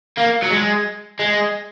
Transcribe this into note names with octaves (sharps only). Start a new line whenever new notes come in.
A#3
F#3
G#3
G#3